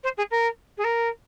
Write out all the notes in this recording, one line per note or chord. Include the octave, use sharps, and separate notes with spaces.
C5
G#4
A#4
G#4
A#4